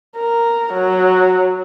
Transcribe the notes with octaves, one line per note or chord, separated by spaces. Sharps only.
A#4
F#3